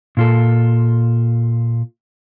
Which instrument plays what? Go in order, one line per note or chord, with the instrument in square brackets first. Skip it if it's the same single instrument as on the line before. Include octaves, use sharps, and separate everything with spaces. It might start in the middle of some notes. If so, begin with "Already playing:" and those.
[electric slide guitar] A#2 F4 A4